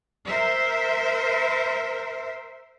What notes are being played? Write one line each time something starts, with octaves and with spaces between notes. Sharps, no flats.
A#4 C5 E5